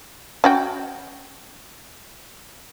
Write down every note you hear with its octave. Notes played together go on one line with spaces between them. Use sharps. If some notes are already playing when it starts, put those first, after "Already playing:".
C#4 F#4 G5